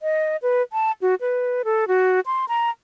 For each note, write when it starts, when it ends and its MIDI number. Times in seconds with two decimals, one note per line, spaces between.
0.01 0.37 75
0.42 0.62 71
0.73 0.92 81
1.02 1.15 66
1.21 1.62 71
1.65 1.88 69
1.88 2.20 66
2.26 2.45 84
2.48 2.70 82